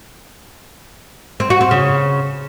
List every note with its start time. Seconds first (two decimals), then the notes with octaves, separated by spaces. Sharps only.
1.40 C4
1.50 F#4
1.61 C4
1.71 C#3